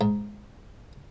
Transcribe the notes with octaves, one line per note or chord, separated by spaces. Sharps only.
G#2